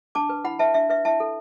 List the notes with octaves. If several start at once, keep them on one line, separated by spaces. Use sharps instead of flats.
D4 A5 D6
B4
E4 F#5 B5
B4 E5 A5
D4 E5
B4 E5
E4 E5 A5
A4